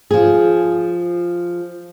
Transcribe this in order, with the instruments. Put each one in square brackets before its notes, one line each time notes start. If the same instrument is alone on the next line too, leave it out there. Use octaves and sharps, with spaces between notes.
[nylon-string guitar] F3 G#4